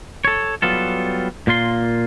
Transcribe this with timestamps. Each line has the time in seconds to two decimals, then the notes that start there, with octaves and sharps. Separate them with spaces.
0.25 A4 C#5
0.62 F#3 G3 B3 F4 A4
1.47 A#2 A#3 F4 C6